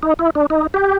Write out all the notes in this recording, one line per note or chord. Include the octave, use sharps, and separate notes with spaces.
D#4
E4
D4
D#4
G4